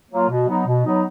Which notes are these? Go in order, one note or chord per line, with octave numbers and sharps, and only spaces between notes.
F#3 A#3 F4
B2
F#3 B3 D#4
B2
F#3 B3 D#4